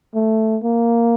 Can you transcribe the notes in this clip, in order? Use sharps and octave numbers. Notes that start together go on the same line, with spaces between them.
A3
A#3